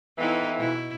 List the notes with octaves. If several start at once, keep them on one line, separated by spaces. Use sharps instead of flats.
F2 E3 B3 D#4 E4
B2 E4